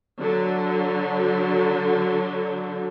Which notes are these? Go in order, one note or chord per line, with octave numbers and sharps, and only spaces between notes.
D3 F#3